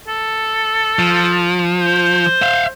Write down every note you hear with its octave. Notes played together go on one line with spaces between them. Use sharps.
A4
F3
C5
E5 F5